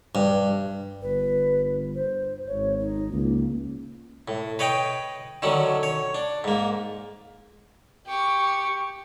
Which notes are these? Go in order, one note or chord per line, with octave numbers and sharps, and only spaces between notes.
G2
G1 B4
C5
G#1 C#5
D#4
C#2 A#3
A2
B4 C#5 D#5 G5
D3 D#3 F#3 C#4
C#5
D4
G#2 A#3
G4 C#6